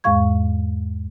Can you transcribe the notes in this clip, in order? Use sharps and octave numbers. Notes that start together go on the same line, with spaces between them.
E2 G#2 G#3 F5 C#6 G#6